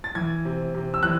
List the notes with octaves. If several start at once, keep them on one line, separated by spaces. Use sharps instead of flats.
A6
E3 G#6
C3
C3
E6
E3 F#6